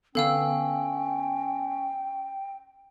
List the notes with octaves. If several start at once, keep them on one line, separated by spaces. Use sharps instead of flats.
D3 B3 C#4 A4 F5 G5 E6